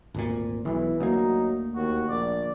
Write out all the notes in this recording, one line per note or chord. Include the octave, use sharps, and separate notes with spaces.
G#1 D2 A#2
B1 E3
D2 F#3 A#3 D#4
D#2 F#4
A#1 D5